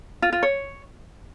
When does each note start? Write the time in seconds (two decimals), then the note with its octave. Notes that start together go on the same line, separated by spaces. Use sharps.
0.22 F4
0.33 F4
0.43 C#5